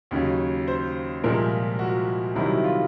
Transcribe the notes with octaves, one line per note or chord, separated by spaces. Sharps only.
D#2 C#3 F#3
C5
C2 A#2 F3 G#3 A#4
F#4
C2 C3 D#3 F#3 E4
F4